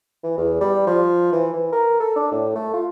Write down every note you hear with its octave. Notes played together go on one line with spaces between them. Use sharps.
E3
E2
G3
F3
E3
E3
A#4
A4
D4
A2
A3
F4